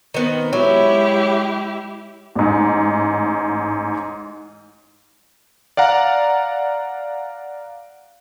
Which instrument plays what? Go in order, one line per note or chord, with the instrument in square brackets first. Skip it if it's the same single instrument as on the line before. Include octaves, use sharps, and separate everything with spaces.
[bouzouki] D#3 B3 C4
[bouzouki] F#3 [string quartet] G#3 E4 G4
[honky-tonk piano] A1 G#2
[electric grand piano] D5 F5 F#5 A#5